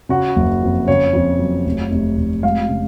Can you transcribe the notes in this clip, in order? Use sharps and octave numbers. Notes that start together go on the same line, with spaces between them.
C#3 F#4
F#1
F2
C#3 C#5
F2
F#3
F1
F1
F1
G#3 F5
C#3